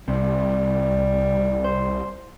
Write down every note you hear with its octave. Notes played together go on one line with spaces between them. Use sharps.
C2 C3 G3
C5